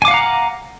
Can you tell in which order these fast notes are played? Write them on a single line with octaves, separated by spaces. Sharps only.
G#5 D6 F5 F#5 A#5